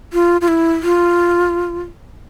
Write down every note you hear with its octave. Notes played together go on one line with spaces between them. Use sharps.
F4
F4
E4
F4